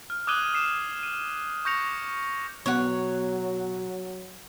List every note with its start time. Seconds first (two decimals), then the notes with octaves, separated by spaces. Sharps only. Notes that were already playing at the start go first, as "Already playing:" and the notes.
0.10 F6
0.27 D6 D#6 F#6 G#6 D#7 G7
0.54 D#6 C7 E7
1.03 D#7
1.65 C#6 G6 A#6 C#7 F7
2.66 B2 F#3 B3 C#5 F#5 F#6